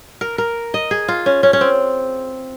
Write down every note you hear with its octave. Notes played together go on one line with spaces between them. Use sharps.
A#4
A#4
D#5
G#4
F4
C#4
C#4
C#4
C4